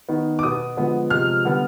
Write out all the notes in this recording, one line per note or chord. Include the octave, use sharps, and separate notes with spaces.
D#3 B3
D6
B2 B3 D#6
D3 F3 G#3 B3
C3 F3 G#3 F6
D3 G3 B3